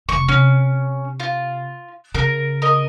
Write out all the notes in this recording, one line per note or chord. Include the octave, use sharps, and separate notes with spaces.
F1 D#3 C#6
C3 C#4
F4
C#3 A#4
A#4 D#5